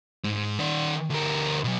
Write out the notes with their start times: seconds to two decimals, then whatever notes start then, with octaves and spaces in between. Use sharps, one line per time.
0.24 G#2
0.59 D#3 D5
1.10 D2 A#4
1.64 B2 F#3